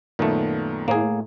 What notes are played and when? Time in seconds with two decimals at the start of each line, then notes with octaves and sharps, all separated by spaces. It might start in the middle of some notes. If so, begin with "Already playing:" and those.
0.19 F#2 A#2 D#3 A3 B3
0.88 A2 A#3 G#4